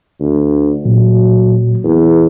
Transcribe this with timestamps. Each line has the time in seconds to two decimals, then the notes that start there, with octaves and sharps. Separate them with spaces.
0.20 D2
0.85 A#2 F#3
1.84 E2